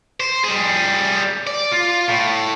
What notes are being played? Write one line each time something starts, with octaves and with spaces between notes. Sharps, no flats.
C5
G3 G#4
D5
F4
A2